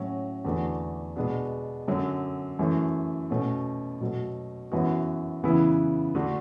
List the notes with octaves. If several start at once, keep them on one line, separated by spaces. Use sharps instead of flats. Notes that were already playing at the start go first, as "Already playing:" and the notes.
Already playing: A2 F#3 C#4 F#4
E2 D3 A3 D4 F#4
B2 G#3 B3 D4 F#4
F#2 D3 F#3
F#2 E3 A3
B2 A3 C#4 F#4
B2 F#3 A3
F#2 E3 B3 F#4
C#3 E3 B3 E4
D3 A3 D4 F#4